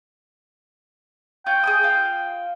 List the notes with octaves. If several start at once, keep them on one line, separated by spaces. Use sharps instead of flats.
F4 C#5 G5 G6
G#4 G#5 D#6
F4 F5